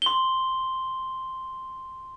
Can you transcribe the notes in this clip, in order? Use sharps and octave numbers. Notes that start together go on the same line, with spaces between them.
C6 G7